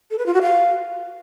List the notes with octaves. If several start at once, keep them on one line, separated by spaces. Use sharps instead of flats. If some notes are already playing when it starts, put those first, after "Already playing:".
A4
B4
F4
F#4
F5